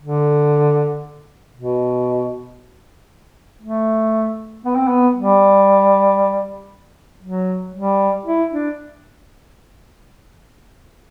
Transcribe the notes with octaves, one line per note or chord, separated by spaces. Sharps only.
D3
B2
A3
B3
C4
B3
G3
F#3
G3
E4
D4